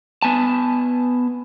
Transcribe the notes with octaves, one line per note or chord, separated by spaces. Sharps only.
B3 G#5 A5